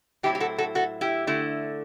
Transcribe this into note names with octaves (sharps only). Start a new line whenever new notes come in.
A2 F#3 C4 E4 G4
G4
F#4 A4
F#4 A4
F#4 A4
E4 G4
D3 A3 E4